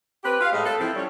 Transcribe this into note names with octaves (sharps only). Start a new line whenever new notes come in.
C4 G4 B4
F4 F5
A2 G#3 B4 D#5
A4
F3 C4 E4
F3 G3 C#4 C#5